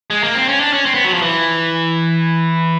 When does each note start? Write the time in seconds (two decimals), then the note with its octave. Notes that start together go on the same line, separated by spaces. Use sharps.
0.10 G#3
0.23 A#3
0.35 C4
0.48 C#4
0.60 D4
0.73 C#4
0.86 C4
0.95 B3
1.04 F#3
1.14 F3
1.22 E3